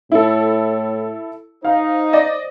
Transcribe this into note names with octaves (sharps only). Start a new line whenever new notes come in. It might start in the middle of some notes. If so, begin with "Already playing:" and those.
A2 E4 A4
D#4 C5 F5
D5 D#5